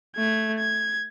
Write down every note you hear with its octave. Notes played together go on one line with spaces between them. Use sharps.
A3 G#6
G#6